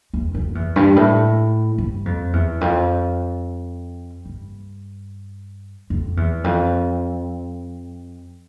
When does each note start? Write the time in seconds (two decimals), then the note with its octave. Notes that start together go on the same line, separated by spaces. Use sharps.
0.14 E2
0.35 F2
0.55 E2
0.76 G2
0.96 A2
1.78 G2
2.06 F2
2.33 E2
2.61 F2
4.25 G2
5.90 F2
6.17 E2
6.44 F2